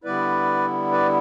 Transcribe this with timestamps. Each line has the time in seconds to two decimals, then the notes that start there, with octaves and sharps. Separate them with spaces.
0.04 D3 G3 B3 E4 B4 D5
0.92 B4 D5